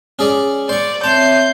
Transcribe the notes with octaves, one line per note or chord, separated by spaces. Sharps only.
C#4 G#4 D5
C5 D5 C#6
C4 C#5 E5 A5 G6 C7